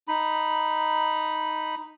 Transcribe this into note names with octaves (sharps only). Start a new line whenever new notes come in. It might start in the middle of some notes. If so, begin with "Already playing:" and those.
D#4 B5